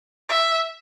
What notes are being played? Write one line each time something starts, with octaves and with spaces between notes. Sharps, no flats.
E5